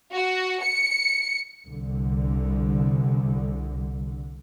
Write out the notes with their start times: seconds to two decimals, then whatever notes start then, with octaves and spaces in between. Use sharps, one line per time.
0.11 F#4
0.62 C#7
1.67 C2 D3